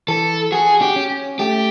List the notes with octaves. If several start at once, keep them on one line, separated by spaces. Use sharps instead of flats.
E3 A4
F#4 G#4
G4
C#4
A3 G4